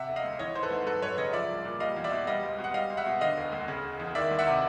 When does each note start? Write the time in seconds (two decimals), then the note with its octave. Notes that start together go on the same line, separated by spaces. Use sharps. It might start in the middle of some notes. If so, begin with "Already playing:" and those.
Already playing: C3 E5 F#5
0.08 E1
0.16 D#5 F5
0.24 D2
0.39 E3 C#5 D#5
0.55 G#1 C5
0.63 A4 B4
0.71 G#2
0.87 F#3 A4 B4
1.02 F#2 B4 C#5
1.18 C#3 C#5 D#5
1.33 F3 D5 E5
1.49 C2
1.65 A#2
1.80 G3 D#5 F5
1.96 E2
2.04 D5 E5
2.12 B2
2.27 G3 D#5 F5
2.43 C#2
2.58 B2
2.64 F#5
2.74 G3 D#5 F5
2.90 C#2
2.97 E5 F#5
3.06 B2
3.21 D3 D#5 F5
3.37 E1
3.52 D2
3.68 C#3
3.83 E1
4.00 E2
4.15 D#3 D5 E5
4.31 D2
4.39 E5 F#5
4.47 C3